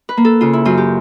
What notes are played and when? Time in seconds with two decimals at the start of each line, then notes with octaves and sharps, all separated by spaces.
0.09 B4
0.17 A#3
0.25 A4
0.41 C#3 F4
0.53 E4
0.65 F#2 F4
0.78 G4